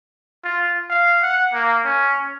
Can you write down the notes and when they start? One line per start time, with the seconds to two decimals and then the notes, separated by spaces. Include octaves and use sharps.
0.44 F4
0.90 F5
1.22 F#5
1.53 A#3
1.85 C#4